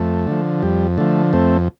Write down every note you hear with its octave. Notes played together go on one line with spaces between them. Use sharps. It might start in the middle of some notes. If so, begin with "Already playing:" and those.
Already playing: F2 A3
D3 F3
F2 G3
D3 F3 A3
F2 A3 C4